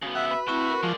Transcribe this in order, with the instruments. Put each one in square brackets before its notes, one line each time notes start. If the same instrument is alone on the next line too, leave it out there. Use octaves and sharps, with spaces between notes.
[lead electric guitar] C#3 B3 [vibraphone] F#4
[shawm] E5 [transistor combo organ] F#5
[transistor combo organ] B4
[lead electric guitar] A2 E5 [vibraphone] C4 E4 A5 [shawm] F#4
[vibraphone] A#4
[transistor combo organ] F3 [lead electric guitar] G#3 D5